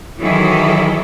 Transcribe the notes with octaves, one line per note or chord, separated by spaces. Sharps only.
D#3 E3 F#3 E4 G#4 A4